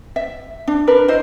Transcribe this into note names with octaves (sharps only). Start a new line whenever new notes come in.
E5
D4
D4 A#4 B4
E4 C5 D#5